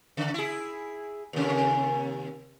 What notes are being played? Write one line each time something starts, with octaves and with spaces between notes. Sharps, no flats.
C#3
E4 G#4
D#2 C3